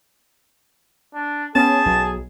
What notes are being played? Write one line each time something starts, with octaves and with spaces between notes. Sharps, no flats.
D4
B3 C#4 G#4 A5
B1